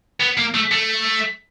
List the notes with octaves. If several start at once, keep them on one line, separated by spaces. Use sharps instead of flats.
B3
A#3
A3
A3